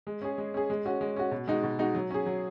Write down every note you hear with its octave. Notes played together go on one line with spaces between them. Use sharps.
G#3
C#4 G#4
G#3
C#4 G#4
G#3
C#4 F#4
G#3
C#4 F#4
B2
G#3 D#4 F#4
B2
G#3 D#4 F#4
F#3
C#4 G#4
F#3